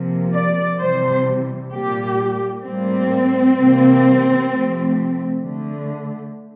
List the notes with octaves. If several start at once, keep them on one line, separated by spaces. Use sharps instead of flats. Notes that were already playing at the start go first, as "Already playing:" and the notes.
Already playing: C3 F3 A#3
D5
C3 E3 G3 C5
A#2 G3 A#3 G4
A2 G3 A#3 C4
C3 E3 G3 A#3
C3 F3 A3
D3 A3